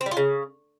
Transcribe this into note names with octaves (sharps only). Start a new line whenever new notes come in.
C4
G3
F4
C#3